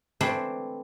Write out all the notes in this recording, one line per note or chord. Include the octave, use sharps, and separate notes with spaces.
E3 A3 C4 D4 E4 C5